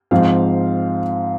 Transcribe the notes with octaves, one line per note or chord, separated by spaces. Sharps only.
G#2 F3 C4 F5